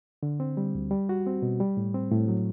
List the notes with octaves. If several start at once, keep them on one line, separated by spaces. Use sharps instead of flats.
D3
C4
G3
D2
G3
F#4
C4
B2
G3
A2
C4
A2
F#3